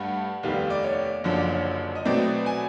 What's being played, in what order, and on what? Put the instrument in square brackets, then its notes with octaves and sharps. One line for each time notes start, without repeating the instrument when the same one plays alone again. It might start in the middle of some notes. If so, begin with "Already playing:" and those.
Already playing: [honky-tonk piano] G2 A3 [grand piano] F#5
[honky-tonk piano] F1 D#2 D#3 G3 B3 [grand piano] F5
[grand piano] D5
C#5
[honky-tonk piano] F#1 F#2 D3 F3 [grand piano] C#5
[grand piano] D5
C#5
D#5
[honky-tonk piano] B2 F#3 A3 C4 [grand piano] D5
[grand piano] G#5